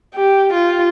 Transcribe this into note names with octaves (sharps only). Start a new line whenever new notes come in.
G4
F4